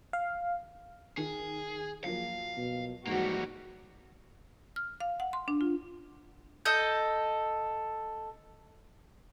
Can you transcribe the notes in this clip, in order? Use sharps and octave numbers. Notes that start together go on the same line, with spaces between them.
F5
D#3 G#4
F3 F#3 A#3 F5
B2
G#2 E3 F3 G3 A#3 F#4
F6
F5
F#5
C6
D4
F4
A4 D#5 G6